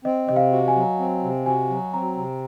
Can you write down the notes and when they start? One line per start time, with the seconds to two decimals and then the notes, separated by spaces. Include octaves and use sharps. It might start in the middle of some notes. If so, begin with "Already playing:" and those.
0.05 C4 D#5
0.29 C3 D#5
0.36 F5
0.52 F#4
0.68 G#5
0.76 F#3
0.99 C4
1.23 C3
1.46 F#4 G#5
1.70 F#3
1.94 C4 A#5
2.17 C3